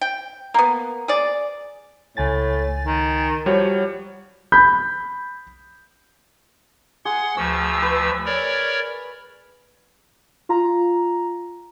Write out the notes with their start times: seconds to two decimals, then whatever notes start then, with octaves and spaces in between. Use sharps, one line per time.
0.01 G5
0.54 A#3 B3
1.08 G#4 D5
2.17 C#2 A2 G#5 A6
2.85 D#3
3.46 F3 G3 F#4 C#5
4.52 B5 G6
7.05 G#4 F#5 C6
7.37 D2 F3 C#6 E6
7.82 B4
8.25 A#4 C#5 D5
10.49 F4 A#5